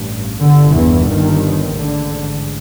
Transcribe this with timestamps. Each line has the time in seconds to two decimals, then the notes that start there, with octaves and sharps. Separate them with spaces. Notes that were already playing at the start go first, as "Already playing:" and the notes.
Already playing: A1 G2
0.41 G1 G2 D3
0.74 E2 E3
1.07 D#2 D#3
1.74 A1 G#2 D3